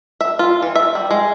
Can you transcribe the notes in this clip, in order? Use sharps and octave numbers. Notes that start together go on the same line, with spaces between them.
E5
F4
E3
E5
G3
G#3